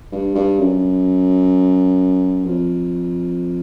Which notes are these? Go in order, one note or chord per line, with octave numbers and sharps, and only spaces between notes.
G2
G2
F#2
F2